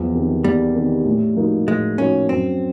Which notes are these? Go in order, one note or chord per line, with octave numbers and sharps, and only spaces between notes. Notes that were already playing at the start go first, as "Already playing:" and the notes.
Already playing: E2 F3
C3 D#3
E2 G3
C3 D#3
A2
F3 A#3 D#4 F#4
A2 G#3
F3 A#3 C#4 D#4 F#4
F#2 C4